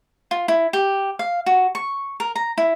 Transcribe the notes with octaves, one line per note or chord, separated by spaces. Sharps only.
F4
E4
G4
F5
F#4
C#6
A#4
A#5
E4